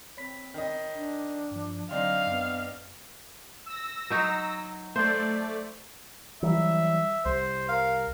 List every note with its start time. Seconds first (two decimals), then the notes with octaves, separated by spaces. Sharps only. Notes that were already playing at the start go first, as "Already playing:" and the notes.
0.17 C4 C#5 B5 B6
0.54 D#3 D#5
0.94 D4
1.51 G2 F3
1.91 D3 F#3 C4 D4 D#4 F5
2.27 F#2 B3
3.66 E6 A#6
4.10 F#3 D#4 C#5
4.96 A3 C5 D5
6.42 E3 F#3 G3 E5
7.25 C2 C5
7.69 A#4 F5